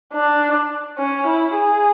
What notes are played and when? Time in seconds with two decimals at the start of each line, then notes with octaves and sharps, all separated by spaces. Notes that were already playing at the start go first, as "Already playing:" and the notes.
0.14 D4
0.98 C#4
1.27 E4
1.55 G#4